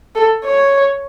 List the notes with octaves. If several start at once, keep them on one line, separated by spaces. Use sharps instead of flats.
A4
C#5